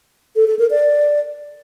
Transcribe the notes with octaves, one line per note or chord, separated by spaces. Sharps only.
A4
A4
A#4
D5